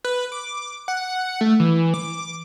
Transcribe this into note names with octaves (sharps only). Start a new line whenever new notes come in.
B4
D6
F#5
A3
E3
D6